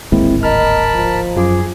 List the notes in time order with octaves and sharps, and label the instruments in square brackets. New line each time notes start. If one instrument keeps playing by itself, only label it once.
[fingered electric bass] D1 G#1 A#3 [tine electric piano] G#3 C4 E4
[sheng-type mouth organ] A#4 A5 B5 [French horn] D#5 [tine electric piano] F6
[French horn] F3
[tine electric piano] F#2 F4 D6 [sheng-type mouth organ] G#4